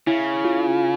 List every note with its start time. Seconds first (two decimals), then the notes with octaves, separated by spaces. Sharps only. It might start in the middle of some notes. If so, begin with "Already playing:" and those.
0.07 C#3 E4
0.45 F4